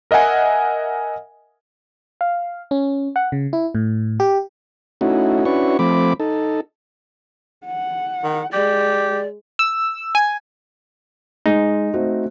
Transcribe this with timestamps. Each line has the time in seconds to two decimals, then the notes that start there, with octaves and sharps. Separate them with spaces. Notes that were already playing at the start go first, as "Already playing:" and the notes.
0.11 A#4 D#5 E5 F#5 G#5
2.21 F5
2.71 C#4
3.16 F#5
3.32 C#3
3.53 E4
3.75 A2
4.20 G4
5.01 A3 C#4 D#4 E4 F#4
5.45 C#4 D4 E4 F#4 B4 C#6
5.79 F3 A3 C4 B5 D6
6.20 D#4 A4
7.66 F#5
8.23 D#3
8.53 G#3 G4 D5
9.59 E6
10.15 G#5
11.46 G#3 D#4
11.94 A3 C4 F#4